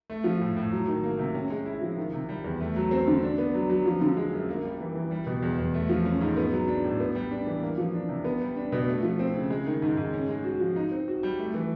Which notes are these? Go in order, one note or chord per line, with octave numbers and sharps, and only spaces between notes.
A3
F3
A2
A2
F#3
D#3
A#3
C3
C#4
G#3
E4
F3
D#3
C3
G3
E2
A3
F#3
C4
D3
D4
B3
F#3
F#3
F3
D3
G#3
F#2
A#3
G3
E3
E3
G3
B2
E2
E2
A3
F3
C#4
G#2
B3
F#3
D4
A2
B3
G3
D4
E3
A#3
F3
D4
C3
B3
G3
D4
B2
A3
F3
C4
C#3
G#3
D#3
G#2
G#2
C#4
G#3
F#4
F3
D#4
C4
F#4
G3
A3
E3